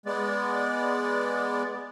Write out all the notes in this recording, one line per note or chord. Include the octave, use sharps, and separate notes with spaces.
G#3 B3 D5